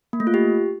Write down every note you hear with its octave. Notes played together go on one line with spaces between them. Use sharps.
A#3
A3
F4
G4